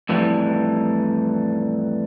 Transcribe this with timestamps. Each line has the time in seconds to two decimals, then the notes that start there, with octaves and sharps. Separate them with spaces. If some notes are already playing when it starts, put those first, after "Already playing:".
0.09 F2 A2 E3 G3